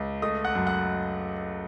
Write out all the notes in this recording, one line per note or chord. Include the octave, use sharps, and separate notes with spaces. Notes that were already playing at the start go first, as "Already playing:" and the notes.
Already playing: C#2
A3 D#5 D#6
F#5 F#6
F#2
F#5 F#6